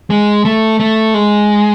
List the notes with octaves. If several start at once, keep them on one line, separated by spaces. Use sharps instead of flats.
G#3
A3
A3
G#3